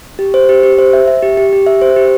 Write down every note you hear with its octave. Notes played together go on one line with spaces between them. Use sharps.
G4
C5
G4
G4
C5
E5
E5
G4
G4
G4
E5
C5
G4